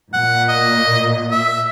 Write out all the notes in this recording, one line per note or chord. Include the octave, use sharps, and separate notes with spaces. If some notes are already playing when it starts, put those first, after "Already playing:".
A#2 F#5
D#5
E5